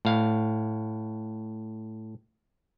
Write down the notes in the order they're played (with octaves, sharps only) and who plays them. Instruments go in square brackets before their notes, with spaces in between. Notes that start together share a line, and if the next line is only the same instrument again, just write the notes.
[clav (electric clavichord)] A2 F5